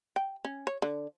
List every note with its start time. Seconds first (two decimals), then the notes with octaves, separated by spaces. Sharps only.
0.16 G5
0.45 C#4
0.67 C#5
0.82 D3